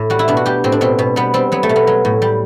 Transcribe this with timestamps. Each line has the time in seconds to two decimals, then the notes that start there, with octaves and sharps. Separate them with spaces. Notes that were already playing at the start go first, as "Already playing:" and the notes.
Already playing: A2
0.10 G3 F#4
0.19 E4
0.28 B2 D4
0.37 F#4
0.46 G3 G4
0.64 A2 C4
0.72 D4
0.81 B2 C4
0.99 B2
1.16 G3 B3
1.34 G3 C4
1.52 F#3 B3
1.63 A3
1.69 B2
1.76 B3
1.87 F#3
2.05 A2
2.22 G3